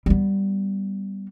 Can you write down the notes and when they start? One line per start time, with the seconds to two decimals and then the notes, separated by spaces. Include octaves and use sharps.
0.06 G3 B3